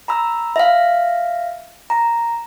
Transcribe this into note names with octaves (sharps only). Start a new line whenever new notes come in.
A#5 B5 E6
E5 F5
A#5